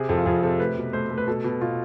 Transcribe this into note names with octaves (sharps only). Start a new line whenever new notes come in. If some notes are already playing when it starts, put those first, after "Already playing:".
Already playing: C3 G#4
F2 A4
F4
F2 G#4
C3 A4
A3 B4
B2
A3 C5
A3
B4
B2 A4
B2
B2 F4